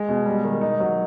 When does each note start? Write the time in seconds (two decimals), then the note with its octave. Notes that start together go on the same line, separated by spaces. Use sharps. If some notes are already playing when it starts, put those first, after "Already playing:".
Already playing: G#3
0.08 B2
0.26 G3
0.44 D#3
0.61 D#4
0.80 F#3